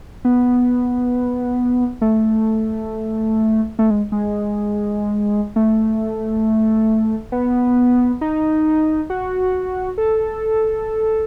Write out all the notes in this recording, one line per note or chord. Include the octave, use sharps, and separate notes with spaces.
B3
A3
A3
G#3
G#3
A3
B3
D#4
F#4
A4